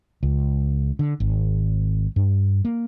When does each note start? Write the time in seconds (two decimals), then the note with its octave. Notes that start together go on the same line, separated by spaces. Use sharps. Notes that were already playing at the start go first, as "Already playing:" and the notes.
0.23 C#2
0.99 D3
1.20 G#1
2.16 G2
2.65 A#3